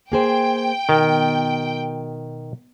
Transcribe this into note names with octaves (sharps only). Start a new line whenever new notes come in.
A#3 G#4 C5 G5
B2 D#3